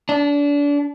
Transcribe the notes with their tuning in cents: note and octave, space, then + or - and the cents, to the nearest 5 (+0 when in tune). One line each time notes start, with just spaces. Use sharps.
D4 -30